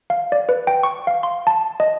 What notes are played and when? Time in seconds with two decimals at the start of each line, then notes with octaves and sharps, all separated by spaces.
0.10 F5
0.32 D5
0.49 B4
0.67 G5
0.83 C#6
1.07 F5
1.23 C6
1.47 A5
1.80 D#5